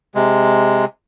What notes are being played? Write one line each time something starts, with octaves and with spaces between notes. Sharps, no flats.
C3 G#3